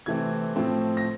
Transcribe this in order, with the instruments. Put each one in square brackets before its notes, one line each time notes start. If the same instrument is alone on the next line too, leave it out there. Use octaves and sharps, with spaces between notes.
[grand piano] C3 E3 A3 C4 G#6
A2 F3 A3 C4
A#6